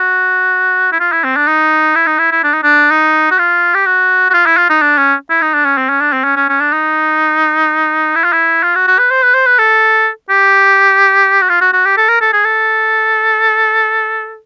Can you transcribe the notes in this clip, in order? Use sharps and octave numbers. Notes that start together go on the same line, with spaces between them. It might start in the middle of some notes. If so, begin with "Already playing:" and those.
Already playing: F#4
E4
F4
E4
C4
D4
D#4
E4
D#4
E4
E4
D4
D#4
D4
D#4
F#4
F4
G4
F#4
F#4
F4
E4
F4
D#4
D4
C#4
E4
D#4
D4
C#4
C4
C#4
D4
C4
C#4
C#4
C#4
D4
D#4
E4
F4
E4
F4
F#4
F#4
B4
C5
B4
C5
B4
A4
G4
F#4
F4
F#4
F#4
G4
A4
A#4
A4
G#4
A4